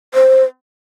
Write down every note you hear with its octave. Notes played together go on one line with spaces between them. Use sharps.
C5